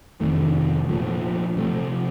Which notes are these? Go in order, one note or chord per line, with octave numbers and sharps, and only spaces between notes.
F2 C3 D#3 A3
A#2 F3 A3
C3 F3 A3